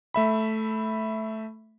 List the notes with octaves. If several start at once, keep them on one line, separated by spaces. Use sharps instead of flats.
A3 E5 B5